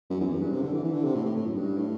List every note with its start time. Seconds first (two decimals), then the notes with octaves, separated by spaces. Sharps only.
0.10 F#2
0.21 E2
0.31 F#2
0.42 G2
0.52 C3
0.62 D3
0.73 E3
0.84 E3
0.94 D3
1.04 C3
1.15 A2
1.26 A2
1.36 A2
1.47 F#2
1.57 G2
1.78 A2